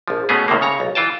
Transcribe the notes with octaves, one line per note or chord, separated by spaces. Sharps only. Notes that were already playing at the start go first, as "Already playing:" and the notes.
A#1 F3
B2 A3 B3 C#4 G#4
C2 A2 C3 D#3 A#3
C#3 C#5 A#5
B1
E3 F4 G5 A5